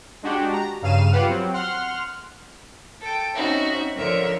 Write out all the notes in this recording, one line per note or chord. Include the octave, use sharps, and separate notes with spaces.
G#3 D4 F#4 G4
A#5
G2 C#3 F5 F6 D#7 E7
F4 G4 B4 F5 F#5
F#3 C4
F#5 C6 F6
A4 G5
C4 C#4 D#4 F#4 E5
D3 F3 A#4 C#5 E5